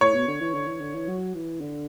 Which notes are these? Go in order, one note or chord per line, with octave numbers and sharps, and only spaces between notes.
A2 C#5
B2
D3
E3
D3
E3
D3
E3
F#3
E3
D3